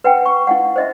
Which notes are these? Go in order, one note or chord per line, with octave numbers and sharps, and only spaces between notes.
B4 F#5 G5
C#6
E4 F5 F#5
C5 D#5 E5